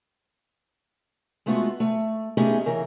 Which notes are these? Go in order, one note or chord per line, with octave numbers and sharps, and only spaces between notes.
G#3 A3 B3 F4 F#4
A3
A3 B3 C#4 D#4 G4 G#4
C#3 E3 A#4